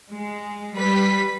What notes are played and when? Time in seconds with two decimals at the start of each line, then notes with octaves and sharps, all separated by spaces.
0.10 G#3
0.75 G3 B4 B6